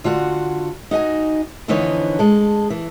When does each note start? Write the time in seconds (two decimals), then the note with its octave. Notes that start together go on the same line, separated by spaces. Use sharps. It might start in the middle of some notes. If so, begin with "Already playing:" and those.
0.04 D3 F4 F#4 F#5
0.91 D#4 F#4 D#5 G#5
1.68 F2 D3 E3 B3 D#4 C#5
2.19 G#3 A4
2.70 E3